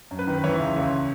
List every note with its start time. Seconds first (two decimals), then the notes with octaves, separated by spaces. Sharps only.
0.11 F#2
0.19 B4
0.27 D#3
0.38 B4
0.44 E3 C#5
0.60 C#2
0.76 C#2